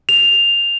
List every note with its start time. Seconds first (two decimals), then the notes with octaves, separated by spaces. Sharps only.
0.09 F7